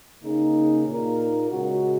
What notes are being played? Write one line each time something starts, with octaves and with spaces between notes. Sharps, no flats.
C#3 A#3 D#4 G#4
A#2 A#3 D#4 A#4
C#3 G#3 F#4